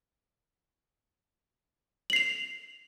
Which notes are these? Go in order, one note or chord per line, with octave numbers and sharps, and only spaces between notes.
C7 F7 F#7